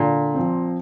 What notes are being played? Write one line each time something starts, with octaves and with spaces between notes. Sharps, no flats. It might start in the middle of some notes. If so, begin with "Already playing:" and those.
Already playing: A#2 D3
F3 C4